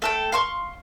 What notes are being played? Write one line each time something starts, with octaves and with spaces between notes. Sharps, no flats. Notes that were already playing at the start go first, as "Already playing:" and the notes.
A3 A4 G5
F5 C6 C#6